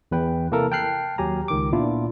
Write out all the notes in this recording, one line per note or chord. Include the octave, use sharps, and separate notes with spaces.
E2 B4 G5
C3 A#3 E4 A4 A#4
G5 A5 F6 F#6 C7
D#2 F#3 G4 G#5 A#5
C#2 D#3 D6
A#2 B3 D4 E4 F4